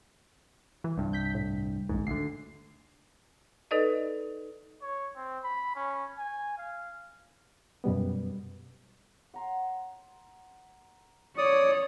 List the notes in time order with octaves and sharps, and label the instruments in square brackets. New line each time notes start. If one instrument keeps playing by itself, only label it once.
[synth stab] E3
[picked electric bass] C2 G2
[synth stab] G6 B6
A2
[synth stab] A#1 D#2 [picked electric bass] G#2
[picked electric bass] D2 D3 [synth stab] C7
[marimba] D#4 A4 B4 D5 D#5
[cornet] C#5
C4
B5
C#4
G#5
F5
[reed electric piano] F#2 B2 G3 B3
[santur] F#5 A#5 C6
[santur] C#4 [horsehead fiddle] C#5 [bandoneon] D5 D#6